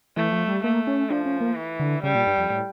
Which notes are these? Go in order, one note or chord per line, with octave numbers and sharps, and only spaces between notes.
E3 A3
F3
G3
A3 A#3
C#4
F3 D4
C#4
A#3
E3
D3
C#3 G3
A#2
G2
F2
A2